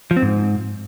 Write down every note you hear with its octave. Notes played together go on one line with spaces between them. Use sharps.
F3
C4
G#2